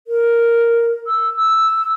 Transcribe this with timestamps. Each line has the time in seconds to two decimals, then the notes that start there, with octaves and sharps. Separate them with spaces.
0.07 A#4
1.07 E6
1.37 E6